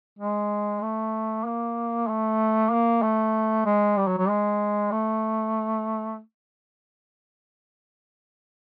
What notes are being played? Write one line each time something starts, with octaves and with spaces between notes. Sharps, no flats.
G#3
A3
A#3
A3
A#3
A3
G#3
G3
F#3
F#3
G#3
A3